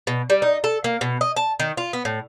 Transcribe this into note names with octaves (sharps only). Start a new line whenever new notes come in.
B2
G3
D#4
A4
A#3
B2
D#5
A5
D#3
F4
B3
A2